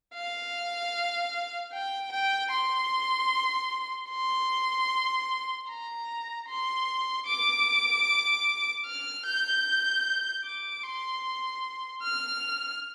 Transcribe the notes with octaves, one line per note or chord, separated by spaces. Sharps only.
F5
G5
G5
C6
C6
A#5
C6
D6
F6
G6
D6
C6
F6